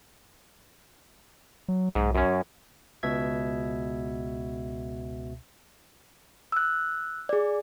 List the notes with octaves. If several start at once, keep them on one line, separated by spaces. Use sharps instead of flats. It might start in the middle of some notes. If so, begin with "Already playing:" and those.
F#3
B1 G#2
F#2 C#4
C#2 B2 E5 G#6
E6 F#6
G#4 D5